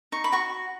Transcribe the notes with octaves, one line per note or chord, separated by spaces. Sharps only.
D#4 C#6
B5
F#4 C#6